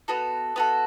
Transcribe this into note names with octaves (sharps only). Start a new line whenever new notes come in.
B3 F#4 A4
B3 F#4 A4